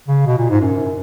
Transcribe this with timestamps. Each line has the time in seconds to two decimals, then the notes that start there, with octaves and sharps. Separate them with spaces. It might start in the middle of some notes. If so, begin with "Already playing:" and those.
0.08 C#3
0.27 B2
0.38 A#2
0.50 G#2
0.61 F#2